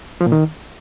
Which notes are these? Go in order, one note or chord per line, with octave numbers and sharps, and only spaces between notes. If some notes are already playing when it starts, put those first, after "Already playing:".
F3
A#2
D#3